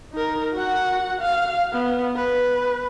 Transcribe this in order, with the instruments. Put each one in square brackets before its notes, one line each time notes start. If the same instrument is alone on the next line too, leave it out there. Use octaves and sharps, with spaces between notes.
[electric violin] D#4 A#4
F#4 F#5
F5
B3
B4